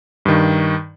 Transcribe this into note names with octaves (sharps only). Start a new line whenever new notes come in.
G2 D#3